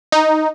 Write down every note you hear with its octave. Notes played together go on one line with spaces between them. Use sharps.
D#4